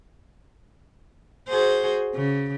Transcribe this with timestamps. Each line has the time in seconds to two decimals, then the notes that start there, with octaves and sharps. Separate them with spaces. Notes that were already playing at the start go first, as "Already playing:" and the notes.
1.48 F#4 G#4 C5
2.15 C#3